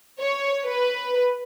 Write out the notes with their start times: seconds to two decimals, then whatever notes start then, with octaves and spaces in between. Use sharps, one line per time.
0.20 C#5
0.65 B4